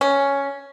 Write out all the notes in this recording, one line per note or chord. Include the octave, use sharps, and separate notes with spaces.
C#4